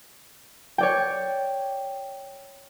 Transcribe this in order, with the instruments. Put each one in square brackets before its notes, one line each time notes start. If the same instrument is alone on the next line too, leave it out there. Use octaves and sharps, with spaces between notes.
[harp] C#5 D5 G5